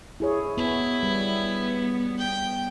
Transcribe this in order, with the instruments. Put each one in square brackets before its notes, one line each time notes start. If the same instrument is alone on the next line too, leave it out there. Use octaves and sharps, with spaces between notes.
[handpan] E4 G#4 C#5
[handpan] B3 [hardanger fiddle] E4
[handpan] G3 [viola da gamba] B3
[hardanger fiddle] G5